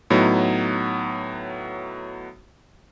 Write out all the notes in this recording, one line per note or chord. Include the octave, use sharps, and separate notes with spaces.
A2 F#3 B3 D#4